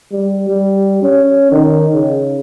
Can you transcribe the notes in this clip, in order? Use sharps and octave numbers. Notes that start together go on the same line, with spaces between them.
G3
G3
C#4
D#3
C#3